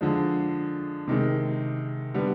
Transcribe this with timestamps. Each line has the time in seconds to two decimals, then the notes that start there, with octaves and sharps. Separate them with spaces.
0.01 D3 F3 G#3
1.07 C3 D#3 G#3
2.14 D3 G3 B3